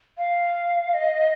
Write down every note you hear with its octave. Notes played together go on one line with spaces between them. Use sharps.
F5
D#5